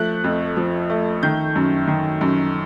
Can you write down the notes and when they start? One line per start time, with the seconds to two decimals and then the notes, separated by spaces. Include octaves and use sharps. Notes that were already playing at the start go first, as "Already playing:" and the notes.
Already playing: F3 A3 F#6
0.24 F2
0.57 F3
0.90 A3
1.23 D#3 G6
1.56 F#2
1.88 D#3
2.21 F#2